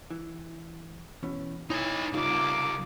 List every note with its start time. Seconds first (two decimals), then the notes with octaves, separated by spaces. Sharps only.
0.10 E3
1.23 B2 E3 C#4
1.70 D#4 E4 B4 C#5 G#5
2.13 C2 C#3 A#3 D#4 F4 A4 D6